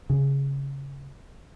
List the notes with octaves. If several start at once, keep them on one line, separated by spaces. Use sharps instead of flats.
C#3